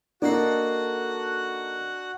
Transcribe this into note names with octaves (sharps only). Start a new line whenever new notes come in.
A#3 D4 D#4 F#4 A4 F#5 C7